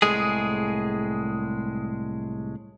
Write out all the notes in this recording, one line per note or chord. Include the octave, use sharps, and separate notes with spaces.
C2 A2 G#3 G#4